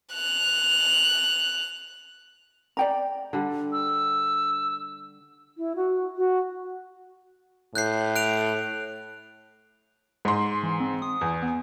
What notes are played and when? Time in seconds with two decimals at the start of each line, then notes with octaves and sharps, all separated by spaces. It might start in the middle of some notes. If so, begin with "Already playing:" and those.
0.13 F#6 F7
2.77 D5 G5 A#5
3.33 D3 G3
3.72 E6
5.57 E4
5.75 F#4
6.16 F#4
7.75 A2 F#6 G6 C7
8.16 F#6 D7 F7
10.25 G#2 G#3 C6
10.63 E3
10.80 C4
11.02 D#6
11.21 E2
11.43 B3